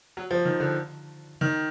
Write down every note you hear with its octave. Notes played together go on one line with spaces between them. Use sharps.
F#3
F3
D#3
D3
D#3